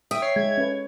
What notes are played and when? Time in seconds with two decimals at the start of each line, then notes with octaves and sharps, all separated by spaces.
0.11 E5 G5 D#6
0.22 C#5 C7
0.36 G#3 G#6
0.58 C#4 A4 B4